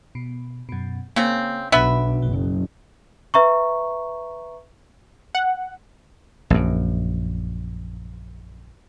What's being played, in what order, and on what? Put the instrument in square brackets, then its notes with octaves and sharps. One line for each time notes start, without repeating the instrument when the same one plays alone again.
[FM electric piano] B2
F#2 B2
[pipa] C#3 C4 [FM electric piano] A#3
[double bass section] B1 [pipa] B3 B4 E5 [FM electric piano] D4
[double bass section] F#1 [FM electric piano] F#3
[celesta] B4 E5 A#5 C#6
[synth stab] F#5
[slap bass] A#1 F#2